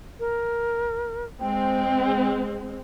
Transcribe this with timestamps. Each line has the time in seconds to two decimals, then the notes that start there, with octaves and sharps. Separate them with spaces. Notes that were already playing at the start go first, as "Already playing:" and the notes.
0.20 A#4
1.40 G#3 C4 G5